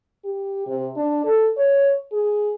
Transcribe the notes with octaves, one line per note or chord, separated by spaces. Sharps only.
G4
C3
D4
A4
C#5
G#4